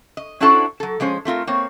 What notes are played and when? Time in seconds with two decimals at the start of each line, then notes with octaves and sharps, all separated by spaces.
0.17 D#5
0.40 C#4 D4 E4 F#4 A4 C5
0.80 F#3 A4
1.00 F3 G#3 C#4 C5
1.25 A3 C4 F4 A#4
1.47 A#3 C4 C#5